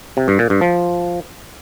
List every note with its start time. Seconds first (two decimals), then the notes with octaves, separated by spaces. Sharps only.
0.17 C3
0.28 G2
0.39 A#2
0.50 G2
0.61 F3